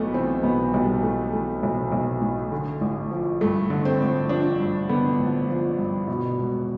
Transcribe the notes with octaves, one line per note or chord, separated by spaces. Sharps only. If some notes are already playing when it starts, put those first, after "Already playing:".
Already playing: B1 A2 A3 B3
E3 C4
B1 B3
B1 G3
A2 A3
E3 A3
B1
B1
A2
D3
A1
F3
G2 A3
D3
C4
A1
F3 D4
G2
D3 B3
A1
F3
G2
B2
E1